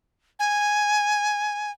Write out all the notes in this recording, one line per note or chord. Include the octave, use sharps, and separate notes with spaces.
G#5